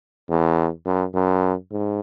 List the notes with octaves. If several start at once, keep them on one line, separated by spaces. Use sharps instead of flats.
E2
F#2
F#2
G#2